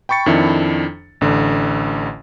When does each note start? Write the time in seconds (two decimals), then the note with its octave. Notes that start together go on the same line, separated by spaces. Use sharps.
0.09 G5 B5 C#6 A6 C#7
0.26 F2 D#3 D4 E4
1.21 A1 D3